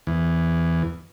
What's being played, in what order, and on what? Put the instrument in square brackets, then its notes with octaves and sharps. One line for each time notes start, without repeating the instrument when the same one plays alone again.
[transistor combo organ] E2